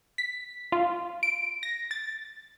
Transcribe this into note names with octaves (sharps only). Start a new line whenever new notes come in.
B6
F4
D7
A#6
A6